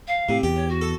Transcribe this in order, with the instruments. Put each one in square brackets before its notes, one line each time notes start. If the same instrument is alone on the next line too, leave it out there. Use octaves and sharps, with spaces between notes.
[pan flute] F5
[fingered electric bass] A2 [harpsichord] C3
[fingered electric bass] E2 [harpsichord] G4
[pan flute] C#5
F#4
[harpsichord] A4